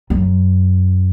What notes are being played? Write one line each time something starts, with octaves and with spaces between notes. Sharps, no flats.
F#2